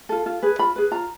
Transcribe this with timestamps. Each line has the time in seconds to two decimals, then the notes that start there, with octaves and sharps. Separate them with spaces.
0.09 F4 A4
0.26 F4
0.42 G#4 B4
0.59 F4 B5
0.76 G#4 B4
0.91 F4 A#5